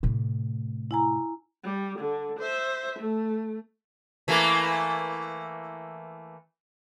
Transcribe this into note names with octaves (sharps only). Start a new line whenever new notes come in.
A2 C3
E4 G#5 A#5
G3
D3
C5 E5
A3
E3 A3 A#3